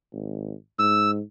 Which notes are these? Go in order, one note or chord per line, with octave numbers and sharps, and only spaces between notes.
G#1
G#2 E6